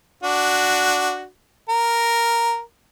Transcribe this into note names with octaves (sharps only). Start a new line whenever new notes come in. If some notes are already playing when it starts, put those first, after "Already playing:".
D4 F#4
A#4